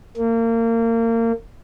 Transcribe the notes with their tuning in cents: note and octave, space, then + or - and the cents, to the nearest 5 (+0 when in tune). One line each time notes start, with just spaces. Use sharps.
A#3 -30